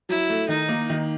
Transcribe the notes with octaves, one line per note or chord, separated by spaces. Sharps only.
F#3 E4
A3
D#3 D#4
A#3
D#3